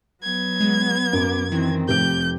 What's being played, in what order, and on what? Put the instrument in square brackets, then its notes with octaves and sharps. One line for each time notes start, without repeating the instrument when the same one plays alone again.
[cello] F#3 B3 [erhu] G#6
[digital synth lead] G#3
[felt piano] F#2 [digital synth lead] D6
[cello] D#3 C4 [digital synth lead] E3
[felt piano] F1 C4 D7 [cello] F2 [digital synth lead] G4 [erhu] G6